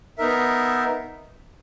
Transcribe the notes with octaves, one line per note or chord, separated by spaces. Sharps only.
B3 D#4 A#4 E5